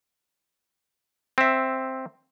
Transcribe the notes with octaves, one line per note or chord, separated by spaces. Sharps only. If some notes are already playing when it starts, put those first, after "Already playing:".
C4 E5